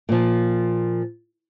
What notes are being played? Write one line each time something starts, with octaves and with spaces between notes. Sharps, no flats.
A#2 F3